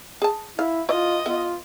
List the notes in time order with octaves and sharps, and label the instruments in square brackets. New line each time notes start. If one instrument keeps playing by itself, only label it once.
[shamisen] G#4 A5
[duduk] E4 [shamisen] F5
[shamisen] E4 [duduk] F4 [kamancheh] D#5
[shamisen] B3 E5 [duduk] F4